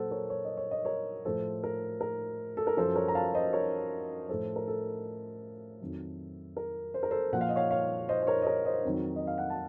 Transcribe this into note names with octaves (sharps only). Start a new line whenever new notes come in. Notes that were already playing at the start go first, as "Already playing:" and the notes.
Already playing: A#2 F#3 A4 C5 F#5
A#4 C#5
C#5
D#5
C#5
D#5
A#4 C#5
A2 F3 A4 C5
A#4
A#4
A4
A#4
F#2 F3 A4 C5
A#4 C#5
A#5
F5 A5
C5 D#5
A#4 C#5
A2 F3 A4 C5
A#4
A4
F2 D#3 F#3
A#4
C5
A#4
A4 C5
A#2 F3 F#5
F5
D#5
C#5 F5
C#5 F5
C5 D#5
C5
A#4 C#5
D#5
A#4 C#5
C5 D#5
F2 D#3 F#3
D#5
F5
F#5
A5